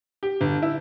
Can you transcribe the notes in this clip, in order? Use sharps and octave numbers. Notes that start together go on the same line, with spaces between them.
G4
G1
E4